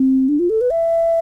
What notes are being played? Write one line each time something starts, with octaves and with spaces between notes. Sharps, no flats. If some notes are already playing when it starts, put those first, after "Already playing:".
Already playing: C4
D4
F4
A4
B4
E5